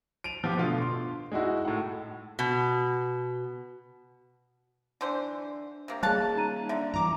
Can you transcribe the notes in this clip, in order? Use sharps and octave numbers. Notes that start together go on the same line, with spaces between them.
D7 D#7 F7
F3 B3 F4 G4
B2 D3 A3 F4
C6
G#3 D#4 E4 F#4
A2 F#5
B2
D3 E3 C5
C3 A#3
G3 A#3 G#4 C#5 F5 A5 F#6
D#4 A#5 D#7
D3 E5
G2 E3 F3 A#5 D6